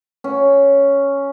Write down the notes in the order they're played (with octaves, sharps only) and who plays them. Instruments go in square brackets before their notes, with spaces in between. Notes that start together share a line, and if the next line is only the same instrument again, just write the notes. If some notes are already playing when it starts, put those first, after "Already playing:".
[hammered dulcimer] C#4